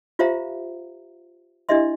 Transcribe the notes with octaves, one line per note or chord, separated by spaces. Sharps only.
F4 G4 C5 E5 F5 A#5
D4 E4 G4 D#5 E5 C6